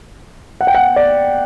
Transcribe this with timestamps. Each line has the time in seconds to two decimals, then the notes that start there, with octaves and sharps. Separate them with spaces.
0.61 F#5
0.67 G5
0.75 F#5
0.96 D5